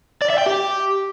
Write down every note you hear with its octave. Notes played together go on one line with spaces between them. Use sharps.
D5
E5
G5
G4